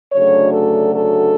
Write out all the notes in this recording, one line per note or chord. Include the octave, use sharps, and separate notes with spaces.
D2 C#3 F#3 A3 D4 C#5
A4
A4